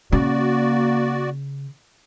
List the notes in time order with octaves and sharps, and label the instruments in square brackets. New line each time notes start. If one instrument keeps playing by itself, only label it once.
[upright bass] C#3 [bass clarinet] A#3 [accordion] F#4 D5